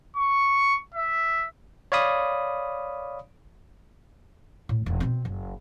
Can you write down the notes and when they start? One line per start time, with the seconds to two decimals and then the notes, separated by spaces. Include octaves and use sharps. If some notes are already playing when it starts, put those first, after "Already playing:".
0.17 C#6
0.94 E5
1.92 C#5 D5 F5 B5 D#6
4.69 A2
4.86 E1
5.00 B2 C4
5.25 F#1